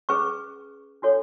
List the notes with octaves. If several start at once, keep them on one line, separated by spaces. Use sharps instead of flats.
C#4 G#4 B4 C#6
D4 F#4 A4 C#5